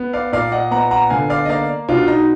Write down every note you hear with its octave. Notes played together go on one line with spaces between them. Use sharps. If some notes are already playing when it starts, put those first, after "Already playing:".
Already playing: B3
D5 F5
A#2 D5 F5
D#5 F#5
B3 F#5 A#5
F#5 A#5
D3 F5 G#5
D5 F5
D#5
A#3 D5 F5
B2 D4 F4
D#4